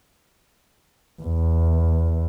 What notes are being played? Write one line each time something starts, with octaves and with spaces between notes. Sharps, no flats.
E2